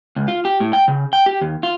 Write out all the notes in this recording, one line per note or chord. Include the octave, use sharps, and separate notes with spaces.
C#2
F4
G4
A2
G5
C#3
G5
G4
D#2
F4